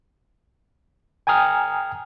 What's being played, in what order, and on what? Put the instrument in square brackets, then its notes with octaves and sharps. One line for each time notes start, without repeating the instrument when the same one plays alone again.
[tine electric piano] G5 G#5 A#5 D#6 F6